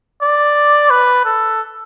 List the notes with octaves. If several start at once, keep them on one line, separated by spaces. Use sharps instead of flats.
D5
B4
A4